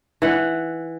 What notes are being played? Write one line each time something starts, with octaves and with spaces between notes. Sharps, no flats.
E3 F#5